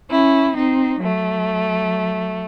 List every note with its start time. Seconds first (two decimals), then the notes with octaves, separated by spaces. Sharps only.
0.10 C#4 E4
0.56 C4 D#4
1.01 F#3 A3